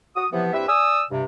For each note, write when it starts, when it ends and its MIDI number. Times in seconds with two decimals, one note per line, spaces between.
0.16 0.27 66
0.16 0.27 87
0.32 0.51 48
0.32 0.51 52
0.32 0.51 53
0.32 0.51 59
0.53 0.67 43
0.53 0.67 55
0.53 0.67 60
0.53 0.67 64
0.53 0.67 71
0.53 0.67 76
0.68 1.02 74
0.68 1.02 80
0.68 1.02 87
0.68 1.02 88
1.11 1.24 43
1.11 1.24 48